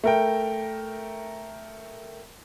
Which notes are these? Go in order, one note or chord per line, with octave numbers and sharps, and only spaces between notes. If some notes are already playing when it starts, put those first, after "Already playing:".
A3 A#4 G5